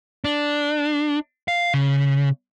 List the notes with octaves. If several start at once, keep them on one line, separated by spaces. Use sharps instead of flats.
D4
F5
C#3